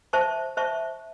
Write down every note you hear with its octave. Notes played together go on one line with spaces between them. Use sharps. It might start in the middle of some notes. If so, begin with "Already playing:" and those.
C5 E5 A5 C#6
C5 E5 A5 C#6